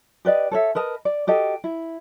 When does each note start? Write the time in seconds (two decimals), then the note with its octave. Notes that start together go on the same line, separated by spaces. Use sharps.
0.25 G4 B4 D5 D#5
0.51 A4 C#5 E5
0.75 A#4 B4 D#5 A5
1.05 D5
1.27 F#4 G4 A4 D#5
1.64 E4